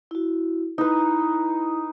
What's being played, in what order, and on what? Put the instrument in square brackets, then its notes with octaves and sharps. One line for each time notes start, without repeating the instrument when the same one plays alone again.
[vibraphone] E4 F#4
[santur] D#4 B4 [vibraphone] E4